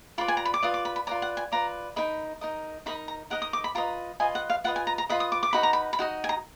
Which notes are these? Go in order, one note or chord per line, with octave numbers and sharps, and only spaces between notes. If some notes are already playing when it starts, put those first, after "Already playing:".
F4 B4 D5 B5
G#5
A#5
B5
D6
F4 B4 D5 D#6
D6
B5
B5
F4 B4 D5 A#5
F#5
G#5
F4 B4 D5 A#5
D#4 A#4 D#5 B5
D#4 A#4 D#5
D#4 A#4 D#5 B5
A#5
D#4 A#4 D#5 F#5
D#6
D6
B5
F4 B4 D#5 A#5
F4 B4 D#5 G#5
F#5
F5
F4 B4 D#5 F#5
G#5
A#5
A#5
F4 B4 D#5 B5
D#6
D6
D6
D#4 F#4 B4 D#5 B5
A#5
B5
B5
D#4 F#4 D#5
G#5
A#5